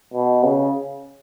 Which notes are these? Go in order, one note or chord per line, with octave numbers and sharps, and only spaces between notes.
B2
C#3